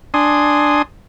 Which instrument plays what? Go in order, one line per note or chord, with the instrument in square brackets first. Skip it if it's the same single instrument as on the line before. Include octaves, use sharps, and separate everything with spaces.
[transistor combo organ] D4 G#5 C6 D#6